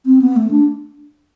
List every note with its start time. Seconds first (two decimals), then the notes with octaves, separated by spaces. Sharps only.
0.06 C4
0.22 B3
0.36 A3
0.51 D4